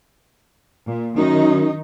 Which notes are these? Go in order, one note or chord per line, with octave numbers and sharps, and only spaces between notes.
A#2
F#2 D#3 D#4